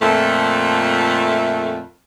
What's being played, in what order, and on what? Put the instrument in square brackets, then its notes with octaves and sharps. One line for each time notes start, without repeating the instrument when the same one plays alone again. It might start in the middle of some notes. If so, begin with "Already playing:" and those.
[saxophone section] F2 A#2 A3